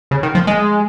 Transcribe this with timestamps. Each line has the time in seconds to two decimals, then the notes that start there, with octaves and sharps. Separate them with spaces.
0.11 C#3
0.23 D#3
0.35 F3
0.47 G#3